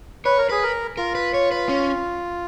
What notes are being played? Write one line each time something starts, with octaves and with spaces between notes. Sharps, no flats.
B4 C#5
A#4
G#4 B4
A#4
F4 A#4
B4
C#5
B4
C#4